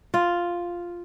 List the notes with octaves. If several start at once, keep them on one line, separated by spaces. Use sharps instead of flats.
F4